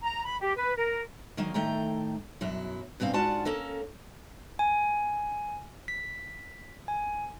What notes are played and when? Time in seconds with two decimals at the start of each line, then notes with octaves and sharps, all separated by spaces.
0.02 A#5
0.23 B5
0.39 G4
0.55 B4
0.76 A#4
1.37 D#3 F#3 A#3 D#4
1.54 A2 D#3 A3 G5 A#5
2.41 F#2 B2 F#3 E4
3.00 G2 B2 C4 C#4 F5
3.13 G#2 D4 F4 F#4 F#5 A5
3.45 A#3 C#4 A4 A#4
4.59 G#5
5.88 B6
6.88 G#5